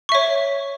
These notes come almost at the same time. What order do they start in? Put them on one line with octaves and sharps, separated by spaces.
C#6 E5 C#5